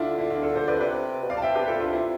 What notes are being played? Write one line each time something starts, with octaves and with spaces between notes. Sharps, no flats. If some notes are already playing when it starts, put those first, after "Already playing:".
Already playing: D3 D4 E4 F4
E4
D4 F4
F4 A4
A4 C5
B4 D5
C3 B4 D5
B2
C3 D5 F5
A5
E5 G5
G4 B4
F4 A4
D4 F4
E4